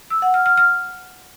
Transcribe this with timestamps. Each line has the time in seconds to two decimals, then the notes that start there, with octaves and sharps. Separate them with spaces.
0.10 E6
0.22 F#5
0.34 F6
0.46 F6
0.57 F6